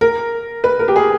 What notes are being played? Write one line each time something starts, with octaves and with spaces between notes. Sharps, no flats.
A#4
B4
A#4
G4
G#4